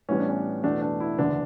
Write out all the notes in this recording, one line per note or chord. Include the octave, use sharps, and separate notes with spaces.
A1 A2 G3 B3 C#4
D4
C#4
E2 B2 A3 D4
D4
E4
F#1 E2 D3 D4